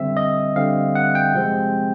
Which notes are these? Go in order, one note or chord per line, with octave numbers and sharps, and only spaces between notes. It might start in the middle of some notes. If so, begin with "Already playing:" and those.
Already playing: D3 G3 C4 E5
D#5
D3 G3 C4 F5
F#5
G5
C3 F3 G#3 C4